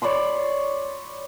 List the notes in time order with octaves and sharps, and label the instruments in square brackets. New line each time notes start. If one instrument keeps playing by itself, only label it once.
[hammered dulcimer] C#5 D5 B5 C6